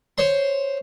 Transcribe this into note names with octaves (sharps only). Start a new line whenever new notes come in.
C5 C#5 C6